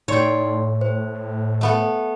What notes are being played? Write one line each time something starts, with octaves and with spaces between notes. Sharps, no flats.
A2 D#4 C#5 D5 G5 C6
C5
A3 B3 A4